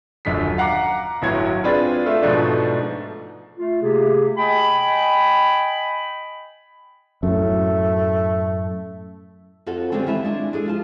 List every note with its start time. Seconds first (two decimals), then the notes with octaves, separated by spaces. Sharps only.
0.25 D#1 F#2 D3 F3 B6
0.58 F5 F#5 A#5 D6
1.22 G1 A2 F#3 G#6
1.64 C4 D4 F4 G#4 B4
2.06 A3 F4 E5
2.22 G#2 B2 F3 A3 D4
3.58 A3 F4
3.82 C3 A3 A#3 G4 G#4
4.37 D#5 G5 G#5 B5
7.23 F#2 A2 A3
9.66 F2 F3 F#4 A4 F#5
9.92 D3 G3 G#3 C4 C#4
10.06 D#3 E3 F4 E5 A5
10.24 G#3 D4 E4
10.53 D4 G#4 A4
10.66 F3 F4 A5